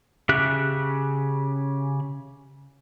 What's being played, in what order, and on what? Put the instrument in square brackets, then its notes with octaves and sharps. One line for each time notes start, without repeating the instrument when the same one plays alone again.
[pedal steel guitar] C#3 G4 E5 F#6